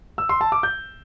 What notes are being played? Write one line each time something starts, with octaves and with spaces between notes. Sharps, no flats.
E6
C6
A5
D6
G6